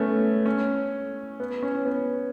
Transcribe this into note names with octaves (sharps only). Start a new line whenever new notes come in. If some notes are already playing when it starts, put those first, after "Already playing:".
Already playing: A3 B3 C#4
C#4
B3
C#4
B3